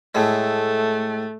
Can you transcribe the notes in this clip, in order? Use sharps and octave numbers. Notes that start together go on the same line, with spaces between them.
A2 G#3 A3